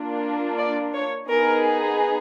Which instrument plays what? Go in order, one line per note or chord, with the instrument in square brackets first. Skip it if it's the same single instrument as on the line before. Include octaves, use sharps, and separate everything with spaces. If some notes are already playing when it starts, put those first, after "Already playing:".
Already playing: [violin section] A#3 D4 F4
D5
C#5
B3 D#4 G#4 A#4